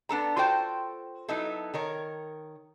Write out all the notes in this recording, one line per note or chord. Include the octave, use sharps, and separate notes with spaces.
B3 D4 A4 A#5
F4 F#4 A4 C5 G5 A5
F#3 B3 D#4 E4 A4
D#3 A#4 C#5